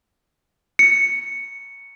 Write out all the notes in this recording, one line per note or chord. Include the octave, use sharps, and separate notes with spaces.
C#7